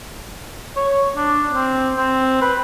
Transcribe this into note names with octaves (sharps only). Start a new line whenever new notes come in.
C#5
D4
C4
C4
B4